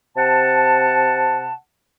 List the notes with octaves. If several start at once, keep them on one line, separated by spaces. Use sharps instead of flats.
C3 F#5 A5